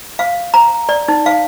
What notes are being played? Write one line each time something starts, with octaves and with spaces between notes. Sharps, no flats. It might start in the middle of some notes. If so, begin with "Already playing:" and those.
F5
A#5
D5
D#4
F5